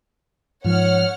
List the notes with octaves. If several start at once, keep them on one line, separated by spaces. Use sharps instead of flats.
G#2 F3 C#5 F#5 F6